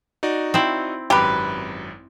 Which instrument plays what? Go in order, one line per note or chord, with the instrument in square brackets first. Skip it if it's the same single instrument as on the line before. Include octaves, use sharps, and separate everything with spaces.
[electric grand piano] D#4 F#4 D5
[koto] C4 E4
[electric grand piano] G#1 F#2 [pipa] G4 B4